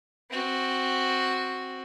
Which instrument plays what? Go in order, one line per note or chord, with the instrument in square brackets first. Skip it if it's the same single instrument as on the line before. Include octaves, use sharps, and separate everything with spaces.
[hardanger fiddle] C4 F#4